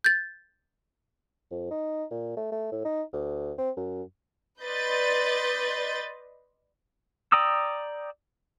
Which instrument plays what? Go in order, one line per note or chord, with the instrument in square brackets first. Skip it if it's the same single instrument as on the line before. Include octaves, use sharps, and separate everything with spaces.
[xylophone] G6 A6
[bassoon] F2
D#4
A#2
A3
A3
A2
D#4
D2
C4
F#2
[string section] B4 D5 D#5 C6 G6 A6
[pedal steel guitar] D5 G5 A#5 D#6 E6